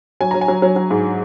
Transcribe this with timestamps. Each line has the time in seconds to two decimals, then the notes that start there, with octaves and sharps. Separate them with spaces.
0.20 F#3 G#5
0.31 F#3 A#5
0.41 G#5
0.48 F#3
0.62 F#3
0.76 F#3
0.90 G#2